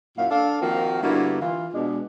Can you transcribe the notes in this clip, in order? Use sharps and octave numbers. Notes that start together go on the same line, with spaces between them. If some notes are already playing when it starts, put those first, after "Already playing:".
F#2 A#2 E4 F#4 F5
D4 A4 F5
D#3 F3 A#3 C4 F4 F#4
G2 D3 A#3 B3 E4 F#4
E3 F4
B2 G#3 D4